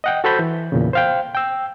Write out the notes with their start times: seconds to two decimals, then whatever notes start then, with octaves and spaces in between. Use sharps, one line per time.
0.04 D#5 F#5 G5
0.24 F#4 A4 C5 B5 G6
0.39 E3
0.72 E2 A#2 C#3
0.93 C5 F5 G5
1.35 G5 E6